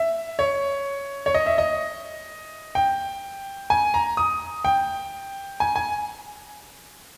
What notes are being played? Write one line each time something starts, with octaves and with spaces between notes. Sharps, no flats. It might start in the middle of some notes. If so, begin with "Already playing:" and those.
Already playing: E5
C#5
C#5
D#5
E5
D#5
G5
G#5
A#5
D#6
G5
G#5
G#5